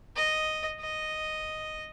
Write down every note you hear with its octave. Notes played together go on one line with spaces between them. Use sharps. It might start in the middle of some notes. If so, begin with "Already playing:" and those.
D#5
D#5